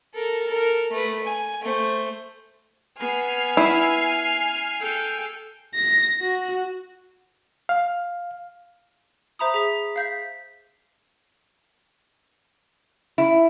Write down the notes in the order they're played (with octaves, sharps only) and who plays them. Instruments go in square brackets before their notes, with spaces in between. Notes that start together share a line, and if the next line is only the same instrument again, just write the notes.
[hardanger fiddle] A4 A#4
A4 A#4
A3 B4
G#5
A3 C5
[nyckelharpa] B3 [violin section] G#5 F6 C7
[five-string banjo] E4
[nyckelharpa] A4 G5
[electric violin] A#6
F#4
[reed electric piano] F5
[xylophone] C5 E5 A#5 B5 D#6
G#4 B6
F5 G6 B6
[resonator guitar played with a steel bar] E4